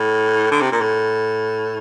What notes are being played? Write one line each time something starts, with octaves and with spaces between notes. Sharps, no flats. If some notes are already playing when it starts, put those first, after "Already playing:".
Already playing: A2
D3
C3
A#2
A2